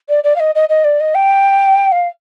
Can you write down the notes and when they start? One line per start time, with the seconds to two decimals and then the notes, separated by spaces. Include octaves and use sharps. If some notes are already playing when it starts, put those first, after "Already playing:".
0.09 D5
0.24 D5
0.36 F5
0.40 D#5
0.55 D#5
0.69 D#5
0.84 D5
1.00 D#5
1.15 G5
1.92 F5